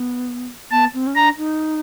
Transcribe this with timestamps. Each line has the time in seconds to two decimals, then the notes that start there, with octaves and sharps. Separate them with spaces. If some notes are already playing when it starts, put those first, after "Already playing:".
Already playing: B3
0.71 B3 A5
0.94 C4
1.07 C#4
1.15 D4 A#5
1.37 D#4